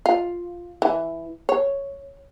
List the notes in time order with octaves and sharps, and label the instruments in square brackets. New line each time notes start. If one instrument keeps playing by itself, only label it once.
[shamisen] F4
E3
C#5